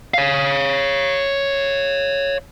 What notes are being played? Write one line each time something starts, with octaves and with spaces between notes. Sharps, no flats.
C#5 F5